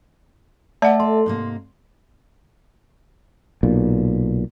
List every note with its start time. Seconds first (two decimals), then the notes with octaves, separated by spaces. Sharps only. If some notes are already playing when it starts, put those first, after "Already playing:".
0.82 A3 D5 E5 F#5 A5
1.00 A4 C6
1.26 G#2 C3 A#3
3.63 B1 A#2